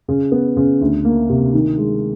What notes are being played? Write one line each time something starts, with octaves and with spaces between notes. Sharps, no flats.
C#3
B3
C#3
D2
A#3
C3
D#3
G#3